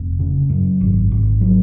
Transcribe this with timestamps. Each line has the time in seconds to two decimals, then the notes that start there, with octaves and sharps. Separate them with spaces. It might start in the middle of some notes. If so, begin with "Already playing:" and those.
Already playing: F1
0.19 C#3
0.50 F#2
0.81 G#1
1.12 G#1
1.41 F#3